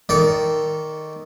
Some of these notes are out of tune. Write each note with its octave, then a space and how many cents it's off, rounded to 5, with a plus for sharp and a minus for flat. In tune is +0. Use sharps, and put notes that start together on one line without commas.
D#3 +0 A4 +0 D5 -25